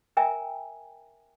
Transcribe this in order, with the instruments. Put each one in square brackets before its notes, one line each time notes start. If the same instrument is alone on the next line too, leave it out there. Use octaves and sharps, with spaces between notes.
[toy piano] A#4 E5 G5 G#5 A#5